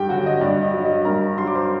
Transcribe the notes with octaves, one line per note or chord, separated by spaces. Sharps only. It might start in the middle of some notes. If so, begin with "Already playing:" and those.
Already playing: G2 G4 G5
D3 F#3 F#4 F#5
D#5
G2 D5
D#5
F#3
D#5
G2 A#4 A#5
F#3 C6
D6
C5 C6